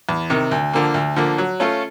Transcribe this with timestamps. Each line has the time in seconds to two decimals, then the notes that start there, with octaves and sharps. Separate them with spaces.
0.09 E2
0.30 C3 D#3
0.51 D2
0.73 D3 F3 A#3
0.94 D2
1.16 D3 F3 A#3
1.38 F#3
1.60 A3 C#4 F4 A4